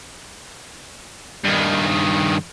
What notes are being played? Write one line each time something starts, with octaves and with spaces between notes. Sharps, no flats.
G2 D#3